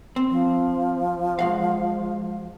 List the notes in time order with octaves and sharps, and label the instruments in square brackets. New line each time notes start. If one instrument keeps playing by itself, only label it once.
[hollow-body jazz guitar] C4
[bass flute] F3
[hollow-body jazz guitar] G#3 F#4 F5